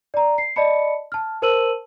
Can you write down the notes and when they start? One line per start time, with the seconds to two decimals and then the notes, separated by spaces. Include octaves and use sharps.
0.14 D5 A#5
0.38 C7
0.56 D5 D#5 A5 B5 C#7
1.12 A5 F6
1.42 A#4 C5 A5 E6 D#7 F#7